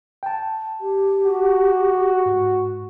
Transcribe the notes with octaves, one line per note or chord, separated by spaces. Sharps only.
G5 A5
G4
F#4
G#2